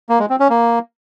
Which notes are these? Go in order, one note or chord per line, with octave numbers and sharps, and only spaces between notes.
A#3
G#3
C4
C#4
A#3